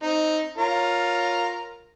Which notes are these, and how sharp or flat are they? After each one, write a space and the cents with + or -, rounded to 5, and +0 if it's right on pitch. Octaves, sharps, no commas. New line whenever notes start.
C4 +5 D#4 +5
F4 +15 A#4 +0 C#5 +0